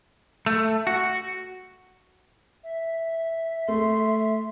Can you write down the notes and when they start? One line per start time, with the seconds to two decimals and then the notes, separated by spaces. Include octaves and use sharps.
0.46 A3
0.87 F#4
2.63 E5
3.68 A3 C6